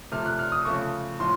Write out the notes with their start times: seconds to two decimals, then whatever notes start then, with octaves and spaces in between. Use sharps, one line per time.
0.12 C3 F3 A3 F6
0.26 F#6
0.39 F6
0.52 D#6
0.65 C#3 F3 A3 C#6
1.19 A2 F3 C6